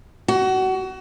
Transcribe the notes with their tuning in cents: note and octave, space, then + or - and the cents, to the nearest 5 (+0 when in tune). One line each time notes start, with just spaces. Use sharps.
F#4 +25